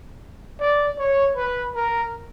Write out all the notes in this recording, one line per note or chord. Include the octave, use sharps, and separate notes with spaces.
D5
C#5
B4
A#4